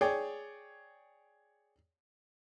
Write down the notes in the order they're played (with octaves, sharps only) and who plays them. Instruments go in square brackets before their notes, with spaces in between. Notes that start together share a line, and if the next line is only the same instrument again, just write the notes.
[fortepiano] G#4 C#5 D5 G5